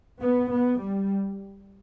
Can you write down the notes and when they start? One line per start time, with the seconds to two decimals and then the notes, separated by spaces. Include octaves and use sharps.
0.20 B3
0.50 B3
0.81 G3